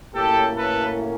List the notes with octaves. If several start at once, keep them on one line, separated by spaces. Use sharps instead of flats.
A2 F#3 A#3 C#4 G4 A4
A4 B4